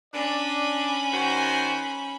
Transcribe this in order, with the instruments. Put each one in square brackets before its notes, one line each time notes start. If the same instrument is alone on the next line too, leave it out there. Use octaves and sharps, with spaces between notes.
[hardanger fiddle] C#4 B5 [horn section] D4 D5
[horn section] D#3 F#4 C5